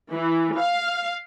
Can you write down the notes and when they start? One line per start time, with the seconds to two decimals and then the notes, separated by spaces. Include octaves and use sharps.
0.12 E3
0.58 F5